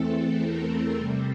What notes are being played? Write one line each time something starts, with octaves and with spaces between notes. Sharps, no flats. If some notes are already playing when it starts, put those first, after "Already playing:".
Already playing: E2 E3 A3 C4 A4
A#4
C3 G3 C4